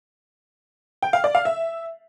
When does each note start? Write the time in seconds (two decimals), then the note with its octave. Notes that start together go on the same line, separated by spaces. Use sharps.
1.02 G5
1.13 F5
1.24 D5
1.35 F5
1.45 E5